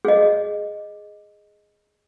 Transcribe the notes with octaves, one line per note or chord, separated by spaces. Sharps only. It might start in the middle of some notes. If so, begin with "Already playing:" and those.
G#4 D#5